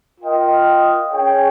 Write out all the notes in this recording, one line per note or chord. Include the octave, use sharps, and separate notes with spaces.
F4 A#4 D#5 G5
C#4 G#4 C#5 G5